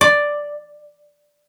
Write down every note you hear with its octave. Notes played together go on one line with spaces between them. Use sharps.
D5